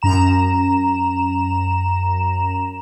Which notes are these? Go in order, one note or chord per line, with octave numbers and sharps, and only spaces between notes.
F#2 A#5 E7